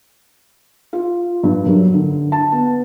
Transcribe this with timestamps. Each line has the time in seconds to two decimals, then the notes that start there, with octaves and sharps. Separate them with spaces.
0.93 F4
1.43 G2
1.66 F#2
1.93 D3
2.32 A5
2.52 B3